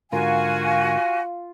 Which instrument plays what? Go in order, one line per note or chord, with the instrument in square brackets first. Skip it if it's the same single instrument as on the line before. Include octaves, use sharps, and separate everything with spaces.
[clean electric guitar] G#2 D3 A#4 [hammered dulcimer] F4 [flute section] F#4 G#5 [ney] F5